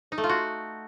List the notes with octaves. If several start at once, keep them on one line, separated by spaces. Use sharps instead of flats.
D#4
A3
F4
F#4